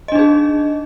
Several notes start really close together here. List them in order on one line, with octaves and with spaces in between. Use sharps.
D#5 D4 D#4 G#4